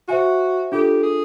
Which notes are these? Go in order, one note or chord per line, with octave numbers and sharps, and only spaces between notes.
F#4 C5 E5 G#5
D4 F4 G4 A4
G#4